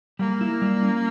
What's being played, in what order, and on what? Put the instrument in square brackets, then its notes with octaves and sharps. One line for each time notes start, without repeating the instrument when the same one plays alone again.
[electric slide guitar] G3 [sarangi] A#3
[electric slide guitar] E4
G3
C#4